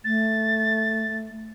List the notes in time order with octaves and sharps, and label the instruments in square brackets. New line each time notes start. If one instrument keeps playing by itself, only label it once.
[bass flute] A3 [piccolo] A6